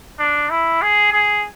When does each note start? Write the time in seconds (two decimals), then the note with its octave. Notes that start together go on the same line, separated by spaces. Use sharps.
0.19 D4
0.50 E4
0.82 G#4
1.13 G#4